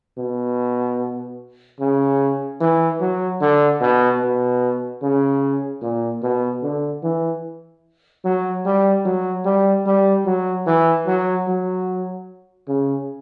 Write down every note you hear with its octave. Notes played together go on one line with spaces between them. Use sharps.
B2
C#3
E3
F#3
D3
B2
B2
C#3
A#2
B2
D3
E3
F#3
G3
F#3
G3
G3
F#3
E3
F#3
F#3
C#3